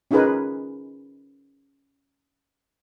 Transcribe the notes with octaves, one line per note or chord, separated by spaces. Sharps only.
C#4 D#4 F4 G#4 A#4 B4